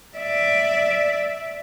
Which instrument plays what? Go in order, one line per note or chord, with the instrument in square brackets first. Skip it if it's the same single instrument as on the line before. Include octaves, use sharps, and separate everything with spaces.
[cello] D5 E5